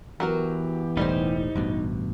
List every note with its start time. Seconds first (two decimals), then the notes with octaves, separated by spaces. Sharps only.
0.20 E3 F#3 B3 F#4 G4 A#4
0.97 E1 A2 G3 D#4 C5
1.55 A1 G2 B2